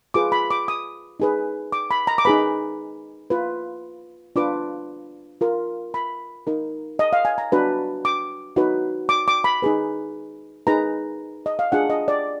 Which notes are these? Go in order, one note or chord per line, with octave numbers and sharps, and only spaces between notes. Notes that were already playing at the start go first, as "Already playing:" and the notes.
F4 G#4 B4 D6
B5
D6
D#6
D#4 G#4 B4
D6
B5
A#5
D6
D#4 G#4 B4 B5
F4 B4
D4 F4 B4 D6
F4 A#4
B5
D#4 A#4
D#5
F5
G#5
A#5
D4 F#4 B4
D6
D#4 F#4 B4
D6
D6
B5
D#4 G#4 B4
D#4 G#4 B4 A#5
D#5
F5
D4 F4 G#4 F#5
D#5
D5